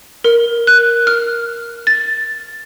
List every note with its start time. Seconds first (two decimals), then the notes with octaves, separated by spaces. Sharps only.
0.24 A#4
0.67 F#6
1.07 F6
1.87 A6